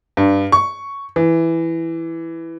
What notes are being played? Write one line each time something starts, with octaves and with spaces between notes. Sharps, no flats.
G2
C#6
E3